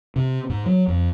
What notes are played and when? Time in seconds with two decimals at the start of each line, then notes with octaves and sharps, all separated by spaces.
0.16 C3
0.50 G#2
0.66 F#3
0.88 F2